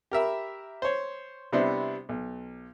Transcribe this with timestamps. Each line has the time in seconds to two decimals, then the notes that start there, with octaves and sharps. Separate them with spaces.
0.11 G4 A#4 E5 B5
0.82 C5 C#5
1.53 C3 G3 B3 D4 E4 C5
2.09 B1